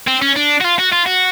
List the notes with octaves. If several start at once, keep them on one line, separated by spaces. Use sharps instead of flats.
C4
C#4
D4
F#4
F4
F#4
F4
F#4